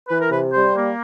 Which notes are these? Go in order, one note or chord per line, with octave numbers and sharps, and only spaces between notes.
E3 B4
A#4
C3 B4
G3 C5
A#3